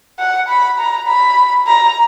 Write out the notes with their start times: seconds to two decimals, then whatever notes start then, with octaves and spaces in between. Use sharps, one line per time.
0.19 F#5
0.49 B5
0.79 A#5
1.08 B5
1.67 A#5